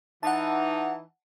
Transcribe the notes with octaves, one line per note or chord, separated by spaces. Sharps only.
E3 D#4 F#5 A5